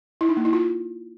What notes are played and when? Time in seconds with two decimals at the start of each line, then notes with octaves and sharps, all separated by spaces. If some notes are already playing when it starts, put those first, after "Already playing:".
0.21 E4
0.29 D#4
0.37 A#3
0.45 E4
0.53 F4